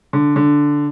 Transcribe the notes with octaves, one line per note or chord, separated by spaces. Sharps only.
D3
D3